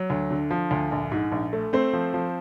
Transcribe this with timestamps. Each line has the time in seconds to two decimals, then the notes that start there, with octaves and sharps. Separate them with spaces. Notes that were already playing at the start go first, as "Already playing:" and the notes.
Already playing: F#3
0.10 D2
0.31 D3
0.51 F3
0.71 D2
0.92 A#1
1.12 G#2
1.32 A#1
1.53 A3
1.73 A3 C4 C5
1.93 F3
2.14 F3